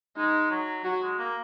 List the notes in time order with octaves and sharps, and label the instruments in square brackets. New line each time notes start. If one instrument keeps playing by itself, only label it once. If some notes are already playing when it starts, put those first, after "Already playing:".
[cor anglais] G#3 [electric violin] D#4
[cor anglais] F#3
[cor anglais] F#3 [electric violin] F#4
[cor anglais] G#3
A#3